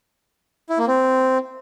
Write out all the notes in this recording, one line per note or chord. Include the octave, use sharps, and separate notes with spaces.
E4
A#3
C4